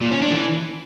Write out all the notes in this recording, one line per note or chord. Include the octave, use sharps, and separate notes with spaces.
A#2
C#4
D4
E3